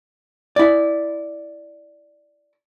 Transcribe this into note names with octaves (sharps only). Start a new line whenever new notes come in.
E4 D5